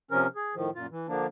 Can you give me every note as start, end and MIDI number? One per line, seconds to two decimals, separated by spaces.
0.11 0.27 48
0.11 0.27 53
0.11 0.27 61
0.11 0.27 70
0.35 0.55 68
0.55 0.70 45
0.55 0.70 51
0.55 0.70 53
0.75 0.86 42
0.75 0.86 46
0.75 0.86 65
0.91 1.07 52
1.08 1.27 50
1.08 1.27 53
1.08 1.27 58
1.08 1.27 62